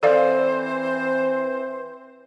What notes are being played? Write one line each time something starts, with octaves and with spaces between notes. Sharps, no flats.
E3 C4 A4 C5 D5 F5